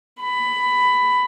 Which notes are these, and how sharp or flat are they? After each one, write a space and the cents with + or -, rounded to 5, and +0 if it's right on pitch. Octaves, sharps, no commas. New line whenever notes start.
B5 +15